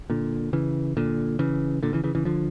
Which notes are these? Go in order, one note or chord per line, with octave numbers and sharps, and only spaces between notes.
A#2 D3
C#3 E3
A#2 D3
C#3 E3
A#2 D3
C#3 E3
C#3 E3
C#3 E3
D3 F3